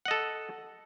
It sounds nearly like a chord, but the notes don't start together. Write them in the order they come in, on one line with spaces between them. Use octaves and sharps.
F#5 D#5 A4